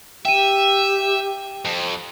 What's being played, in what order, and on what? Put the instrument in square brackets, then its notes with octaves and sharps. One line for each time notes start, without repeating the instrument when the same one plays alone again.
[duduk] G4 [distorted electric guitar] E5 [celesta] G5 D#7
[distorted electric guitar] F2